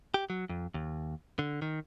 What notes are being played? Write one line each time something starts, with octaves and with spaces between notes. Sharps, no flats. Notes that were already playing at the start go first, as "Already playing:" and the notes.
G4
F#3
F2
D#2
D3
D#3